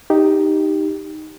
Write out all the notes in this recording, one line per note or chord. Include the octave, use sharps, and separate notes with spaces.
D#4 G4